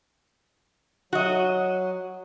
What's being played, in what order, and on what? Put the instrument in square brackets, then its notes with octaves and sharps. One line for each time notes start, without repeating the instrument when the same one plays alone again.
[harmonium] F#3 [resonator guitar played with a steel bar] F#4 D#5